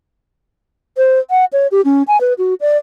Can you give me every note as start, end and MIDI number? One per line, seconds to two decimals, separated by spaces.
0.97 1.19 72
1.31 1.45 78
1.53 1.67 73
1.72 1.81 67
1.85 2.03 61
2.08 2.19 80
2.21 2.33 71
2.38 2.54 66
2.61 2.77 74